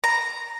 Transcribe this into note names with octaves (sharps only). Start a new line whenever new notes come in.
A#5